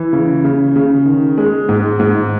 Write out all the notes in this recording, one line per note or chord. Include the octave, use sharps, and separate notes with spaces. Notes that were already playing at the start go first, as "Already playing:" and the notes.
Already playing: E3
C#3
C#3
C#3
D#3
G#3
G#2
G#2